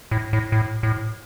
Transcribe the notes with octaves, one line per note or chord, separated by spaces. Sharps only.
A2
A2
A2
A2